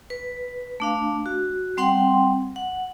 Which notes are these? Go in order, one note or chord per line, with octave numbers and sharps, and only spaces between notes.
B4
A3 D4 F5
F#4
G3 C4 F#5 G5 C6
F#5